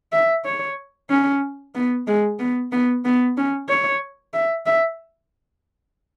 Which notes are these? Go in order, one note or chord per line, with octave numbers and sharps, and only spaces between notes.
E5
C#5
C#4
B3
G#3
B3
B3
B3
C#4
C#5
E5
E5